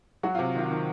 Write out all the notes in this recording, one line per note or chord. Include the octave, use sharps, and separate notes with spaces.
F#3 F#4
C3 F4
D#3 F4
D#3